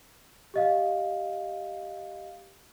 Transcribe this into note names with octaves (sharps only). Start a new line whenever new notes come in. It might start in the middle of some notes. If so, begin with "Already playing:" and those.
G4 D#5 F5